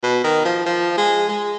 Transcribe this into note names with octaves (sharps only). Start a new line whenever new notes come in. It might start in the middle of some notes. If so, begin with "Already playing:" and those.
B2
D#3
F3
F3
G#3
G#3